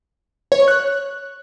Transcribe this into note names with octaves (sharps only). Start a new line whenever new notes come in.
C#5
C#6
F#6